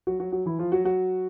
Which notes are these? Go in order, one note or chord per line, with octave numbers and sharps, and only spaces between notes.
F#3 F#4
F#3 F#4
F#3 F#4
E3 E4
F3 F4
F#3 F#4
F#3 F#4